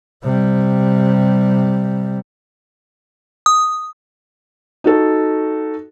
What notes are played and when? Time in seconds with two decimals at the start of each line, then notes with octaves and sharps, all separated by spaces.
0.24 C3 G3
3.46 D#6
4.84 D#4 F#4 A4